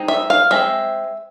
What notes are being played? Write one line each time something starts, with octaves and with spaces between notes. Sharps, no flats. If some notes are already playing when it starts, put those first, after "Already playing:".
Already playing: G#3 C4 D#4
E5
F5
G#3 C4 E5